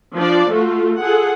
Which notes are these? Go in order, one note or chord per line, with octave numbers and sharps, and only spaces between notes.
F3 D4 D5
A3 F4 F#4
F4 G#4 A4 F#5